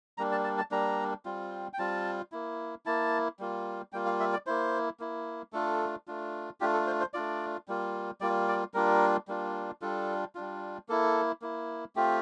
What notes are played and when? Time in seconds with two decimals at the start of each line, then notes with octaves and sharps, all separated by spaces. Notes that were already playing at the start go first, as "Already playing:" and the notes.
0.18 G3 A#3 D4 A#5
0.32 A5
0.44 A5
0.58 A5
0.71 G3 A#3 D4 A#5
1.25 G3 C4 F4
1.73 G5
1.79 G3 C4 F4 A5
2.32 A#3 E4
2.86 A#3 E4 A5
3.39 G3 A#3 F4
3.93 G3 A#3 F4 G5
4.06 F5
4.20 E5
4.33 D5
4.46 A#3 E4 C5
5.00 A#3 E4
5.53 A3 D4 F4 A4
6.07 A3 D4 F4
6.60 A3 D4 F4 G4
6.73 A4
6.87 C5
7.00 C5
7.14 A3 D4 F4 D5
7.68 G3 A#3 F4
8.21 G3 A#3 F4 D5
8.48 D5
8.74 G3 A#3 D4 F4 A#4
9.28 G3 A#3 D4 F4
9.82 G3 D4 F4 A4
10.35 G3 D4 F4
10.89 A#3 E4 A4
11.42 A#3 E4
11.96 A3 C4 F4 G4